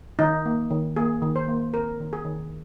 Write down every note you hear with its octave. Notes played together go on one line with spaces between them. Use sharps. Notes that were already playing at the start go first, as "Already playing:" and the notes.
D#3 D#4
A#3
D#3
A#3 G#4
D#3
C5
A#3
C4 A#4
D#3
G#4
D#3